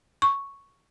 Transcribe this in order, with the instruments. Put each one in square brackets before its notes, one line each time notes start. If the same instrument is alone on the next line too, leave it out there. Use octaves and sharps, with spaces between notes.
[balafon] C#6